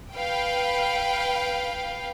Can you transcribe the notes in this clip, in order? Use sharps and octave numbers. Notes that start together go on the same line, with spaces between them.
B4 F5 G5